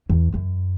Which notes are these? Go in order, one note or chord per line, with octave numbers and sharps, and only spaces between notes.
E2
F#2